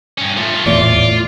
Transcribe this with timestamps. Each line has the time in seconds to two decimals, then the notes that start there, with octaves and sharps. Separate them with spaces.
0.18 G2 C#4
0.37 A3 F4
0.66 D#1 E2 A2 F4 D5